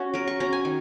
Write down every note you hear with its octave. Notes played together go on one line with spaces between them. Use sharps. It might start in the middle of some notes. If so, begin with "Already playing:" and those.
Already playing: C#4 F#4 F#5
F#3 A#4
C#6
C#4 A#5
G#5
D#3